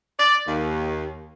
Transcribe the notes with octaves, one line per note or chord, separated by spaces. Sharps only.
D5
D#2